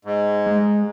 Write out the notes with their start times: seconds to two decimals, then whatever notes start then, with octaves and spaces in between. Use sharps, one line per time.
0.05 G#2
0.46 G#3